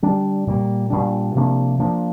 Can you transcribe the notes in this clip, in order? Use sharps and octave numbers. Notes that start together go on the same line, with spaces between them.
D3 G3 D4
A#2 G3 A#3
A#2 G3 D4
C3 F3 A#3 D4
F3 A#3 D4